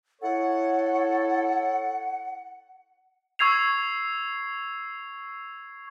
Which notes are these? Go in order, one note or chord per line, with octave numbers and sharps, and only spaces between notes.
E4 A4 C#5 F#5
C#6 E6 G#6 C7 F7